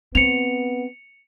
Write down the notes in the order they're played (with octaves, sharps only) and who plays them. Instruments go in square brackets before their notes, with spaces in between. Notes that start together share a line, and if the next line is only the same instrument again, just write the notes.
[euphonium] B3 [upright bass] C4 [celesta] C#7 F7